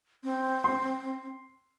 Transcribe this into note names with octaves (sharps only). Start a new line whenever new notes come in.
C4
C6